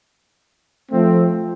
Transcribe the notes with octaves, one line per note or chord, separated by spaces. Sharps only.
F3 A3 C4